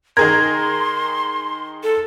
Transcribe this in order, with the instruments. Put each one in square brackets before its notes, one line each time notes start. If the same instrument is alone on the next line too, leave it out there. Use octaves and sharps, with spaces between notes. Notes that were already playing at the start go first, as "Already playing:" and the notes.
[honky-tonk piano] D#3 G#4 A#4 [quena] C6 [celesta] G#6
[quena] A4